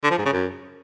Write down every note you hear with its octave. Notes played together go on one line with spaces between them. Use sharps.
D3
F3
G#2
C#3
F#2